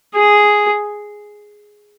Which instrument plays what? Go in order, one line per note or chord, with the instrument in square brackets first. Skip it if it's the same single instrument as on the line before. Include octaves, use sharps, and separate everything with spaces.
[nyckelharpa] G#4